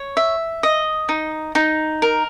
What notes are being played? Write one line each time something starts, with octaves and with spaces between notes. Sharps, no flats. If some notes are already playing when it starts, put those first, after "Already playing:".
Already playing: C#5
E5
D#5
D#4
D#4
A#4